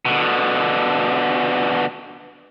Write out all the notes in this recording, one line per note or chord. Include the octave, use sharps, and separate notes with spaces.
B2 D3